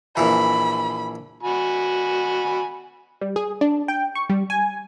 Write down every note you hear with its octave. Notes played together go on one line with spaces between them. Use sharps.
A#1 E3 B5
F#4 G#5 B5
G3
G#4
D4
G5
C#6
G3
G#5